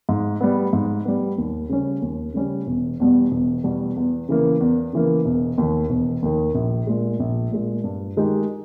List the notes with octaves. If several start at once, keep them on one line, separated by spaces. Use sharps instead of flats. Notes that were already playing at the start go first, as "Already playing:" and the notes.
G#2
G3 B3
G#2
G3 B3
D#2
C#3 G3 C#4
D#2
C#3 G3 C#4
E1
E2 B2 G3
E1
E2 B2 G3
E2
C#3 E3 A#3
E2
C#3 E3 A#3
E1
D#2 D#3
E1
D#2 D#3
A#1
A#2 G#3
A#1
A#2 G#3
G2
D#3 G#3 D#4 G4